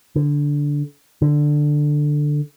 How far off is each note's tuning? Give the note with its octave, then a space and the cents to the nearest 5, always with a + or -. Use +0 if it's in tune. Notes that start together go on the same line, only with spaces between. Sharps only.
D3 -10
D3 +10